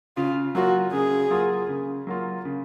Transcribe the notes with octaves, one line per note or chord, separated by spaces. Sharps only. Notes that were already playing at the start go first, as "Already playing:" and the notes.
C#3 F4
F#3 A#3 F4 F#4
C#3 G#4
F#3 A#3 F4
C#3
F#3 A#3 F4
C#3